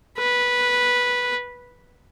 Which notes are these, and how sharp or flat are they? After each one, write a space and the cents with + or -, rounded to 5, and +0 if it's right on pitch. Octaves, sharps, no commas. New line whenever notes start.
B4 -10